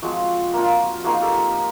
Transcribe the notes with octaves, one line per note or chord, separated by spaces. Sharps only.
F3 G#3 C4 F#4
A#3 D4 F4
F3 A#3 D#4 F#4 G#4
G4 A4